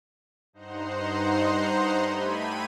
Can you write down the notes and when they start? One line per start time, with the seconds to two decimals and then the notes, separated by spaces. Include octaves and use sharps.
0.53 G2 D#4 C5 F#5 A#5 C6
2.02 A3 G4 B5 G#6 D#7